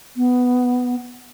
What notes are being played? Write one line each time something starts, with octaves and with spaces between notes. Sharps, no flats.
B3